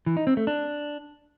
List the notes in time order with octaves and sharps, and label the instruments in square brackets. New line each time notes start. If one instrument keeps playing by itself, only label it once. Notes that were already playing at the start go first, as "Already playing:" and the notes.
[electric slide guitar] E3
D#4
C4
A3
D4